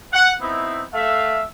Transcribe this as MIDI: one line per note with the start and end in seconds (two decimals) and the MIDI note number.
0.12 0.32 78
0.41 0.82 59
0.41 0.82 60
0.41 0.82 63
0.41 0.82 64
0.93 1.41 57
0.93 1.41 76
0.93 1.41 77